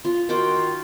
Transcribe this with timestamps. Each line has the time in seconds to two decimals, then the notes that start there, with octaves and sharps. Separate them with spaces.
0.05 F4
0.29 D#3 F4 F#4 G5 C6 D6